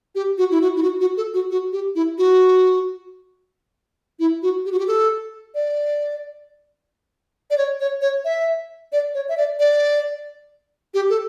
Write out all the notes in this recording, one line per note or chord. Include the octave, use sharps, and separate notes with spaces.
G4
F#4
E4
F#4
E4
F#4
F#4
A4
F#4
F#4
G4
E4
F#4
E4
F#4
G4
F#4
G4
A4
D5
D5
C#5
C#5
C#5
E5
D5
C#5
E5
D5
D5
G4
A4